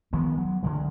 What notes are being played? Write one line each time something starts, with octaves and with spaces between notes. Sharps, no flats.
D#3 F3 G#3 B3
F#3
D2 D3 E3 G#3